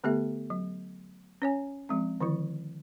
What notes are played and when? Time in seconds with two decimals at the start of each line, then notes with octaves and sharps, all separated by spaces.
0.04 D3 A3 B3 G4 A4 E5
0.50 F#3
1.42 C#4 C#5 G#5
1.89 F3 G#3 C4
2.21 D3 D#3 F3 E4